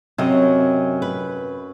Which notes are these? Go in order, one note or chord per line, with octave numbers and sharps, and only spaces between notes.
F#2 C3 F#3 D#5
B4